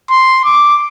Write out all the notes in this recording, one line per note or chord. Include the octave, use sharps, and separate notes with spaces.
C6
D6